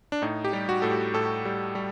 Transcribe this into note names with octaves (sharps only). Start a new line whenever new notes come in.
D4
A2 D#4
G4
G3
F#4
A2 A4
G4
A2 A4
G3
G3